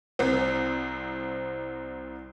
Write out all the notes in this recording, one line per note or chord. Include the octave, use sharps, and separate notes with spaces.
C2 C4